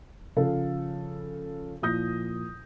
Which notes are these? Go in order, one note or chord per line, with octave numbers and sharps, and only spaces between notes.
C#3 F3 A4 F5
A#2 F3 E4 D#6 G6 A#6